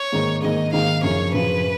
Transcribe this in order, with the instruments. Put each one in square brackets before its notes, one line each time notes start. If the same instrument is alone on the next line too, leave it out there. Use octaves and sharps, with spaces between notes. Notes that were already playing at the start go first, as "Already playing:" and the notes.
Already playing: [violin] C#5
[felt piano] G#2 D#3 A#3 D#4
[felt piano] G#2 D#3 A#3 D#4 [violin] D#5
[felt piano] G#2 D#3 A#3 D#4 [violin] F5
[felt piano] F#2 C#3 F3 [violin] C#5
[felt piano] F#2 C#3 F3 [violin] B4